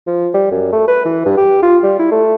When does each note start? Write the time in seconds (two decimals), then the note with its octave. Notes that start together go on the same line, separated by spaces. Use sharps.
0.07 F3
0.34 G3
0.51 F#2
0.73 A3
0.88 B4
1.05 E3
1.26 G2
1.37 G4
1.63 F4
1.83 G3
1.99 E4
2.11 A3